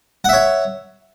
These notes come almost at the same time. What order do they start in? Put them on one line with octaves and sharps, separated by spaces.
F#5 E5 C#5